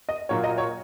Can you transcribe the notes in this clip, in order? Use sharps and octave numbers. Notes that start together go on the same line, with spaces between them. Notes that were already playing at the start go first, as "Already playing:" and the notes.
D#5
A#2 F#3 A#3 C#5
D#5
C#5